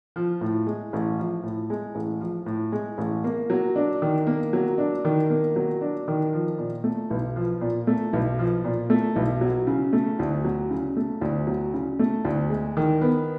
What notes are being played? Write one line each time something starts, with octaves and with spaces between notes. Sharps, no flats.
F3
A2
G#3
A1
F3
A2
G#3
A1
F3
A2
G#3
A1
A#3
F#3
D4
D#3
A#3
F#3
D4
D#3
A#3
F#3
D4
D#3
F3
A#2
A3
B1
F3
A#2
A3
B1
F3
A#2
A3
B1
F#3
C#3
A3
D2
F#3
C#3
A3
D2
F#3
C#3
A3
D2
G#3
D#3
B3